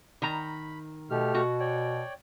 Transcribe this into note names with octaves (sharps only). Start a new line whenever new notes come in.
D#3 A#5 B5
B2 A3 G4 F6
B2 F#4
C#5 D5 G5